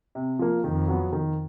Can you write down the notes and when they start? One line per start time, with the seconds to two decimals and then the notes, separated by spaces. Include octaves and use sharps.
0.15 C3
0.39 F3 A#3
0.64 F2 D#3
0.88 F#3 B3
1.12 D#3